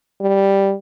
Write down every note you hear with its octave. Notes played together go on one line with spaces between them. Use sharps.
G3